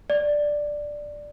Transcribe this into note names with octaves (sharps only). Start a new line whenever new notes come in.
D5